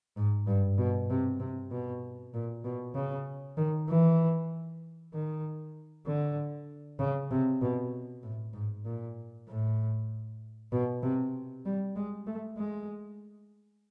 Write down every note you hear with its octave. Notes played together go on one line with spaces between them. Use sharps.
G#2
G2
B2
C3
C3
B2
A#2
B2
C#3
D#3
E3
D#3
D3
C#3
C3
B2
A2
G#2
A#2
A2
B2
C3
G3
G#3
A3
G#3